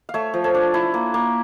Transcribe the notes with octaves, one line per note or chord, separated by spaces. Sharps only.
F5
A3 C#5 E5
F3
A4 C#5
D4
E4
A#3
A#3